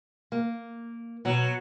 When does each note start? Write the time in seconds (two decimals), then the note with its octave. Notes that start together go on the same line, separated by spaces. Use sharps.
0.32 A#3
1.25 B2 F#3